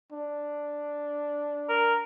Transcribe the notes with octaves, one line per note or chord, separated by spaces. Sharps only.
D4
A#4